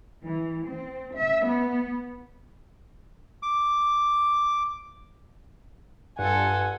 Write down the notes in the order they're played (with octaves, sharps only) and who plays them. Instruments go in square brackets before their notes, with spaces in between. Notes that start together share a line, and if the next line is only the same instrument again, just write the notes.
[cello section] E3
C4
E5
B3
[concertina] D6
[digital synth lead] G2 [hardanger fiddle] F4 A4 [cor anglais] F#5 [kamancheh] G#5